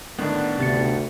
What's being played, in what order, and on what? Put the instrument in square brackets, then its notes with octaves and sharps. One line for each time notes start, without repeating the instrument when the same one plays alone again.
[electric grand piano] A2 D3 D#3 [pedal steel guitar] B3 D4
[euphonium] D2 [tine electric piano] C3 A6 C#7